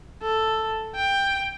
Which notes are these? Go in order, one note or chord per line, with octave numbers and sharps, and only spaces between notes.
A4
G5